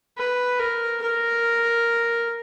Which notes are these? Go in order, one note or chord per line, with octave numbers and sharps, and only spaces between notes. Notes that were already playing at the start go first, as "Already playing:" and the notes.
B4
A#4
A#4